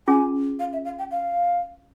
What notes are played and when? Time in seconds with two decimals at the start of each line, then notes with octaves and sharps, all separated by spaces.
0.08 C#4 F4 G#4 G#5
0.59 F5
0.73 E5
0.85 F5
0.99 G5
1.11 F5